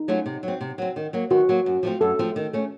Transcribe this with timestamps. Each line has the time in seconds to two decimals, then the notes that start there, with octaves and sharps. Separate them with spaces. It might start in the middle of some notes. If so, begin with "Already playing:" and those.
Already playing: D#4
0.08 F#3 A3 C#4 F4
0.26 C3
0.43 F#3
0.48 C4
0.61 C3
0.78 F#3 C4
0.96 D#3
1.13 F#3 A#3
1.30 D#3 F#4
1.49 F#3 A#3
1.66 F#2
1.83 F3 A3 C4 F4
2.01 F#2 A4
2.19 F3 A3 C4 F4
2.36 D#3
2.53 A3 C#4